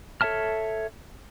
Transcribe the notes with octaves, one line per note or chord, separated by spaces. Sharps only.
A4 C#5 E5 A5 F6